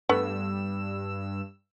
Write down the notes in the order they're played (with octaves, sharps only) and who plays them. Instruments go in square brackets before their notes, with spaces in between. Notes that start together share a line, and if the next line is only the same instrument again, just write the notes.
[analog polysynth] G2 E6 [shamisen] A3 B3